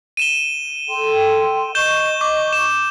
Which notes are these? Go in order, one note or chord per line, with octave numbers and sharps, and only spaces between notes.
D#7 E7 G7
A4 G5 C6
D#5 C#6 G6 E7 G7
D6
E7